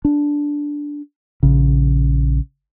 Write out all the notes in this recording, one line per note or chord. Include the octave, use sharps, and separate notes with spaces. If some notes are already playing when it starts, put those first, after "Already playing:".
D4
A#1 C#3